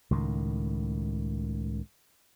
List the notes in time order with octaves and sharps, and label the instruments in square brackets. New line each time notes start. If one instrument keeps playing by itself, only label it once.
[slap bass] C#2 A2 D#3